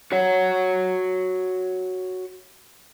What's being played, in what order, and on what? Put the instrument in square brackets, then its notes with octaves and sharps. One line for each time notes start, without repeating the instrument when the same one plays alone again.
[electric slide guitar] F#4 C#5 F#5